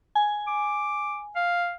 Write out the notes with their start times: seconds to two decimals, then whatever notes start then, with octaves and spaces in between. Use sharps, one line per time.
0.15 G#5
0.47 D6
1.36 F5